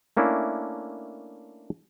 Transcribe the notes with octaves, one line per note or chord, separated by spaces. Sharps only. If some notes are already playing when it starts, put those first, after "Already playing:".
A3 A#3 C#4 D4 E4